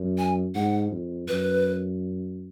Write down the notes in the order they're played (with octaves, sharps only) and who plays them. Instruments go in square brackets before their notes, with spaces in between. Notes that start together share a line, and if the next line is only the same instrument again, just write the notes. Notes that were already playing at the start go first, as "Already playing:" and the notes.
Already playing: [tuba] F#2
[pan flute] G#5
[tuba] G#2 [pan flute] F#5
[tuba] F2
[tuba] F#2 [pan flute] B4